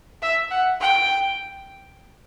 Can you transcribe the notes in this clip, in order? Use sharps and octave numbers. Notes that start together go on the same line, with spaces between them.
E5
F#5
G5